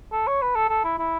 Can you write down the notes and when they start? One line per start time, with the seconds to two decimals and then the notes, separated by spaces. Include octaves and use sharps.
0.12 A4
0.27 C#5
0.42 B4
0.55 A4
0.69 A4
0.84 E4
0.99 E4